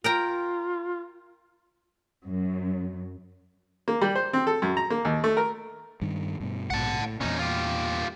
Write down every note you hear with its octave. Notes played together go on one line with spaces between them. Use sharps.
F4 A#4 G5 A#5
F#2
A#3
G3
C5
C4
A4
F#2
A#5
A#3
D#2
A3
A#4
G2 D#3
G2 B2
A#1 G#2 B2 F#5 A5
A2
E2 A#2 C#4 D#4
F4 G4